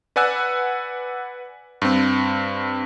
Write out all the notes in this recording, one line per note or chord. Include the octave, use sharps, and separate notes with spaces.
B4 D5 F#5 G#5 E6 F#6
G2 C4